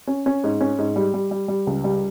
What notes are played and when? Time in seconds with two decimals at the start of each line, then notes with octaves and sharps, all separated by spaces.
0.07 C#4
0.26 C#4
0.44 G#2
0.61 C#4
0.78 G#2
0.96 G3
1.14 G3
1.31 G3
1.48 G3
1.67 C#2
1.84 G3